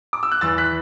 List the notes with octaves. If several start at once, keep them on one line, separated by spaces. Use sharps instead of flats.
D6
E6
F#6
E2 E6 A6
F#6 B6